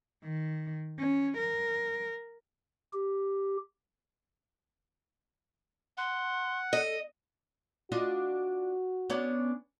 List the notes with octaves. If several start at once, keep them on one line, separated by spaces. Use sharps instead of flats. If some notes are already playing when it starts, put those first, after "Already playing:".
D#3
C#4
A#4
G4
F#5 C6
A4 D#5
D4 F4 F#4 D#5
B3 C#4 D4